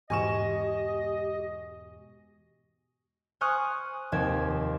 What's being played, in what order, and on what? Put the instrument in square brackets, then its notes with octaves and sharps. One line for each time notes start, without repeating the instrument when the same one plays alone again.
[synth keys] E2 G#2 B2 [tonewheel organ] G4 [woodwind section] D#5 [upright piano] G#5 C#6 E7
[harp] C5 G#5 C#6 D#6 F6 F#6
F1 D#2 C4 G#6 E7